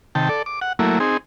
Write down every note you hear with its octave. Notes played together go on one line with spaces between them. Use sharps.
C3 D#3 G5 A5
A4 D5
D6
F#5
F#3 A3 A#3 E4
C4 D#4 G#4